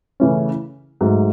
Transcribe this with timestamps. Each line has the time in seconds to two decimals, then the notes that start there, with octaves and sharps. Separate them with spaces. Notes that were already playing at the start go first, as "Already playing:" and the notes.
0.20 C#3 E3 A3 C#4
1.01 G#2 F#3 A3